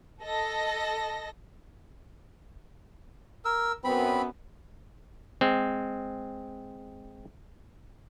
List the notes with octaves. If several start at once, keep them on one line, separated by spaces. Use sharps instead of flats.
A4 D#5 A#6
A#4 E6
F#2 B3 C4 B5
G#3 C4